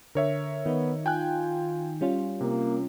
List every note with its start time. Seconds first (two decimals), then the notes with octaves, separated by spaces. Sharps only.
0.15 D3 A#4 C#5 E5
0.66 D#3 B3 D#4
1.06 F4 G5 G#5 F#6
2.01 G3 C#4 F4
2.41 C3 A#3